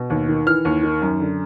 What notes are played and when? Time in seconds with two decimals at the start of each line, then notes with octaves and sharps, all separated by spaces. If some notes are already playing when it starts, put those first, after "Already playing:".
Already playing: B2
0.10 D#2
0.28 D#3
0.46 E3 F6
0.65 D#2
0.83 D#3
1.02 F#2
1.20 D3